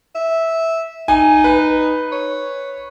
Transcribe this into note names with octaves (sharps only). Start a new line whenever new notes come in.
E5
D#4 G#5
B4
C#5